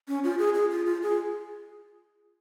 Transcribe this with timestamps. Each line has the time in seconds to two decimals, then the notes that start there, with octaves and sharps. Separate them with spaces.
0.08 C#4
0.24 F4
0.39 G#4
0.54 G#4
0.71 F4
0.86 F4
1.03 G#4